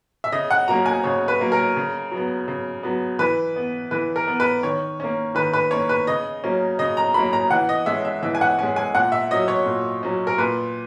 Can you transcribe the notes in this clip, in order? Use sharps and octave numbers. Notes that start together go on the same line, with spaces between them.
E5
C#3 D#5
F#5
F#3 A#3 C#4 A#5
G#5
C#3 C#5
B4
F#3 A#3 C#4
A#4
C#3
F#3 B3
C#3
F#3 B3
E3 B4
B3
E3 B4
A#4
B3
B4
D#3 C#5
A#3 C#4
D#3 B4
B4
A#3 C#4 C#5
B4
C#3 D#5
F#3 A#3 C#4
C#3 D#5
A#5
F#3 A#3 C#4 B5
A#5
E3 F#5
D#5
G#3 C#4 E5
E5
E3 E5
G#5
F#5
G#3 C#4 G#5
G#5
A#2 F#5
E5
F#3 C#4 D#5
C#5
A#2
F#3 C#4
A#4
A#2 B4